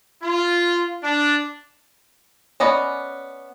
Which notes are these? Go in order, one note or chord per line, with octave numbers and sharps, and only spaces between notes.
F4
D4
B3 C#4 D5 D#5